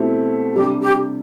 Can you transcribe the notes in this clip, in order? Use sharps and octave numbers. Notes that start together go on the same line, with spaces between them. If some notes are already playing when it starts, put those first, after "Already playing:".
Already playing: B2 A3 C4 E4 G4
C3 G3 D4 G4
G4